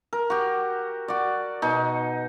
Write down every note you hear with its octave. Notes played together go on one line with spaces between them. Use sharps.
A#4
F#4 G4
F#4 D5
B2 D#4